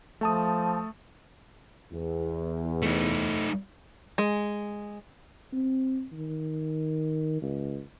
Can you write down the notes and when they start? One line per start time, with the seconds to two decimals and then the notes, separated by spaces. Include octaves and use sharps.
0.21 F3 A3 A5 D#6
1.92 E2
2.82 A3 D#4
4.18 G#3
5.53 C4
6.12 D#3
7.42 C#2